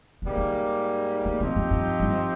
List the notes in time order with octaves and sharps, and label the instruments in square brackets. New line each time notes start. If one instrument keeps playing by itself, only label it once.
[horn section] G#2 [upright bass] C3
[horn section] G3 A#3
[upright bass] C#3
C#3
[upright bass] C3 [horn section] F3 C4 D#4 G4
[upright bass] G2
G2
G2